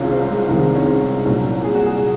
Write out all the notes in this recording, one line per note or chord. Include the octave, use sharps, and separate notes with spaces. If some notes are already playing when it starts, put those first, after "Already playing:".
Already playing: C2 C3 D#3 G#3 C#4 F4
C4
G#3
C2 C3 D#3 G#3
C#4
C4
C2 A#2 F#3 C#4
G#4
F#4
G#4